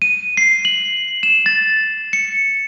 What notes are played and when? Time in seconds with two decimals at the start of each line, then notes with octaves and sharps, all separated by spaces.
0.02 D#7
0.37 C7
0.65 F#7
1.23 E7
1.46 A6
2.13 C#7